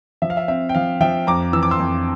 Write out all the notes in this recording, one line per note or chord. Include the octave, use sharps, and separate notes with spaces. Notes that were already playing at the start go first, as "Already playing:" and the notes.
F3 E5
F5
E5
C4 E5
G5
F3 F5
F3 E5 G5
F2 A#5 D6
E3 E6
D6
C6 E6
F2